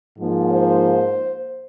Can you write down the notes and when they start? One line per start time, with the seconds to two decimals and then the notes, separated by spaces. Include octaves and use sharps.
0.18 G#2 F3 A#3
0.52 C5